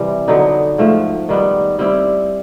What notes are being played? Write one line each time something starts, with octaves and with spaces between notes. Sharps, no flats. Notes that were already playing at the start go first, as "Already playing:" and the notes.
Already playing: C3 E3 G3
D3 F#3 B3 D#4
G#2 F3 A3
D#3 G3 B3
G3 C4 E4